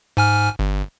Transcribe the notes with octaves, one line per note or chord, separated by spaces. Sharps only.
G#2 G#5 F6
G1